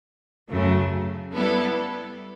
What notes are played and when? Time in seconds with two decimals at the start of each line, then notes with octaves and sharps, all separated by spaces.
0.49 F#2 C#3 F#3 A3
1.35 G3 B3 E4 A4